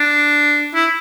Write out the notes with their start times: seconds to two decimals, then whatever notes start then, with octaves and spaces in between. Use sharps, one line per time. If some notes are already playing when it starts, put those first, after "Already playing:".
Already playing: D4
0.74 E4